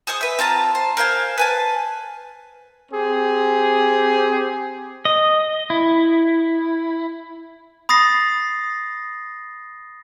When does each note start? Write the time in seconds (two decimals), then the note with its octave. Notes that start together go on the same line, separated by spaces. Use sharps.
0.07 G#4 C5 C#6 D#6
0.21 B4 E5
0.39 C4 F4 A5 A#5
0.75 C5
0.97 A#4 C5 F5 G#5
1.38 B4 G#5 A5
2.92 C4 G4 G#4
5.05 D#5
5.70 E4
7.89 B5 D#6 A6 A#6 C7